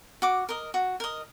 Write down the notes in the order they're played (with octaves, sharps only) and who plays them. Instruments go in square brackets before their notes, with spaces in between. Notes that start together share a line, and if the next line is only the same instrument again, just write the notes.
[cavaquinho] F#4 D6
A#4 D#5
F#4
A#4 D#5